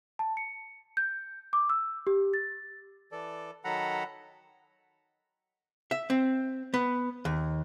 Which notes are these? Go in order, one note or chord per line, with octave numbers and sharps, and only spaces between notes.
A5
C#7
G6
D6
E6
G4
A6
E3 A4 D5
D#3 F#3 A4 F#5 A#5 B5
E5
C4
B3
D#2